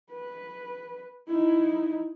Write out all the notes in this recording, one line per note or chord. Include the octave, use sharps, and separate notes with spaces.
B4
D#4 E4